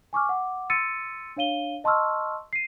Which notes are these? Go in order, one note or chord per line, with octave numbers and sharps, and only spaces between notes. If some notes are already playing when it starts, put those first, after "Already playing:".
G#5 C#6 D6 F6
F#5 D6
C6 E6 A6 C#7 D#7
D4 C#5 F5 D#7 G7
D#5 A5 C6 C#6 E6 F6
C7 D#7